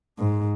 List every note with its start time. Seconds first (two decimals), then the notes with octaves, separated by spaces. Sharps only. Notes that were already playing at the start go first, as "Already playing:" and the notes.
0.19 G#2